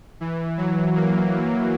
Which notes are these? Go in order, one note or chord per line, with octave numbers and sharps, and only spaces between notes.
E3
F#3
A#3